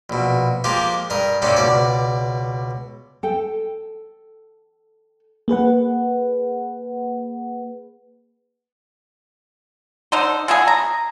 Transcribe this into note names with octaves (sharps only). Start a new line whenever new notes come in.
A#1 B2
F3 G#3 A#3 F4 G4
G2 A#4 D#5
G#2 C3 A#3 C#4 D4
C#2 B2 D5
A4 G5
A#3 G#4 B4 F#5
D3 D#4 C5
G#3 A3 B3 G#4
A#5